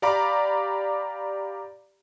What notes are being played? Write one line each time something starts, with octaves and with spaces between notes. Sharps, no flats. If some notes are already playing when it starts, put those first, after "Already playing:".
G4 D5 F5 A#5 B5 D6